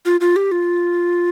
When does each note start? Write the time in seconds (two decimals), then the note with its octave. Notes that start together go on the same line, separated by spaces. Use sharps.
0.05 F4
0.21 F4
0.36 G4
0.52 F4